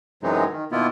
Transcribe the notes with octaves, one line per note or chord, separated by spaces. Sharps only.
F#2 C3 E3 F#3 G#3 D#4
D#3
B2 D#3 A#3 B3 E4 F4